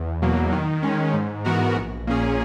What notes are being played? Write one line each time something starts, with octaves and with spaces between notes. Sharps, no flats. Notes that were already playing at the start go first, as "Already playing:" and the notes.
Already playing: E2
B2 F#3 A#3
D#3
G#3 C#4
G#2
E3 B3 F#4 A#4
A#1
A#2 A#3 C#4 G#4